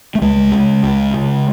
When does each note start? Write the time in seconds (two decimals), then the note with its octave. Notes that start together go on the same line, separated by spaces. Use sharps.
0.15 A3
0.21 C#2 G#3
0.52 C#3
0.82 C#2
1.14 C#3